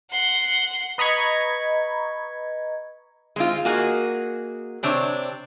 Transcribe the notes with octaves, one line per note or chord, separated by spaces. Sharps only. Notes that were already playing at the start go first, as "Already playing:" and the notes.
F#5 C6
B4 D#5 A#5 B5 C#6 G#6
G#3 C4 F4
A#3 F#4 G#4 D#5
C3 C4 D4 C#5